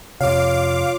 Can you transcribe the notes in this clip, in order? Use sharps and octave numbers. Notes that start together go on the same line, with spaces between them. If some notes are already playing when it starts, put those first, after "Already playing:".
F2 C3 F4 C#5 F5 D6